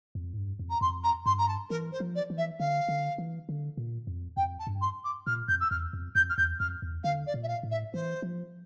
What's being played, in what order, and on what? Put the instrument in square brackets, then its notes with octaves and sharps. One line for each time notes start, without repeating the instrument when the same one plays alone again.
[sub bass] F2
A2
G2
F2
[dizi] A#5
[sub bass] F2 [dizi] C6
[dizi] A#5
[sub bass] G2 [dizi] C6
[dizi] A#5
A5
[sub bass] E3 [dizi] A#4
[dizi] C5
[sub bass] F3
[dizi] D5
[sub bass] E3
[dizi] E5
[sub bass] D3 [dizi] F5
[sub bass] D3
E3
D3
A#2
F2
[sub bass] F2 [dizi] G5
[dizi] A5
[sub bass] G2
[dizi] C6
D6
[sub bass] A#2 [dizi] F6
[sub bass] F2 [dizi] G6
[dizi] E6
[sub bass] E2 [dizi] F6
[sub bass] F2
[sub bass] F2 [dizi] G6
[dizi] F6
[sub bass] E2 [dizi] G6
[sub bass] F2 [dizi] F6
[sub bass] E2
[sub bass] D3 [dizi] F5
[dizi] D5
[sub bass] A#2
[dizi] E5
F5
[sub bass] A2
[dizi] E5
[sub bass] E3 [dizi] C5
[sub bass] F3